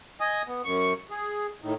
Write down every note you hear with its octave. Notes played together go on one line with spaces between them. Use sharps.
D#5 G#5 D#6
B3
F#2 C#6
G#4
A2 D#3